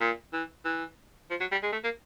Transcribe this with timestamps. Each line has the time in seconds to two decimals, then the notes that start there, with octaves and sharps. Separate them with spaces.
0.01 A#2
0.33 E3
0.65 E3
1.30 F3
1.40 F#3
1.52 G3
1.63 G#3
1.72 A3
1.84 A#3